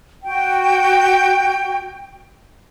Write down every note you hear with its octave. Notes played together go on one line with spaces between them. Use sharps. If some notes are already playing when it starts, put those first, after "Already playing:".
F#4 G5